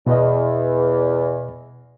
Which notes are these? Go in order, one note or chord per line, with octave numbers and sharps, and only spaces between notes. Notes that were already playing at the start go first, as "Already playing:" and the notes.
E2 B2 D#5